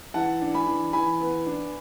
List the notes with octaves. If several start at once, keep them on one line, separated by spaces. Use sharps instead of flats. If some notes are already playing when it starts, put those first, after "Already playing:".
E3 F#5 A5
D4
G#5 B5
E3
E3 G#5 B5
B3
D4